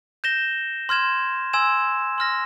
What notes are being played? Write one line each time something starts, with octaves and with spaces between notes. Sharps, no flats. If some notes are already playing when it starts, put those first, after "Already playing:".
G6 A#6 E7 G7
C6 F6 G#6 E7
G#5 C6 E6 G#6 E7
C6 F6 A#6